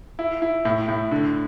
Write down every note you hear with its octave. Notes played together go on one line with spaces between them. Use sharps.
E4
E4
A2
A2
D3